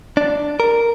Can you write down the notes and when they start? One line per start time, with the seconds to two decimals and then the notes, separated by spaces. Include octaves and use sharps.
0.17 D4
0.60 A#4